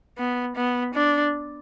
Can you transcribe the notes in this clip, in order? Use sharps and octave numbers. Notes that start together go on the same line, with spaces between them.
B3
B3
D4